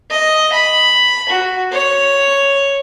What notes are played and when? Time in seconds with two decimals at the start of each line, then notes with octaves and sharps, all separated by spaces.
0.11 D#5
0.53 B5
1.30 F#4
1.73 C#5